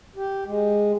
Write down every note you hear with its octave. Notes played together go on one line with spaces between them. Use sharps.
G4
G#3